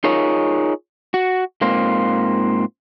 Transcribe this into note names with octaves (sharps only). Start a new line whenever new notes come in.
D#4 F4 G#4 A#4 C#5
F#4
G#2 A#3 C4 F4